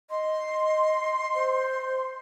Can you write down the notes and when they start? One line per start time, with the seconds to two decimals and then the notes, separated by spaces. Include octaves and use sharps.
0.10 D#5 C6
1.35 C5